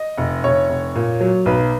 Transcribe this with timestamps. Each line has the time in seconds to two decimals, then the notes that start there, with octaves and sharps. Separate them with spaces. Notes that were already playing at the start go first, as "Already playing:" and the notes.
Already playing: D#5
0.18 F1
0.44 F1 C#5
0.69 F1
0.95 A#2
1.21 F#3
1.46 B1 B4